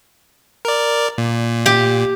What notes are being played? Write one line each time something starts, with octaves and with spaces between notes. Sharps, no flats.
A#4 D5
A#2
G4